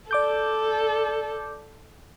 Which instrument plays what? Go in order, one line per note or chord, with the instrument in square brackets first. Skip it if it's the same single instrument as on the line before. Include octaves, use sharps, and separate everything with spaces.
[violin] A4 [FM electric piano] D5 D6 G6